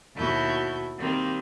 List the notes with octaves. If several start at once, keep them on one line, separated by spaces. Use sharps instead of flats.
D#2 B2 E4 F#4 A5 G6
D#3 G3 A#3 C4